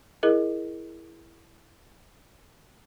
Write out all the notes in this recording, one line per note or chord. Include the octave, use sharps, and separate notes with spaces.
E4 G#4 A#4 D#5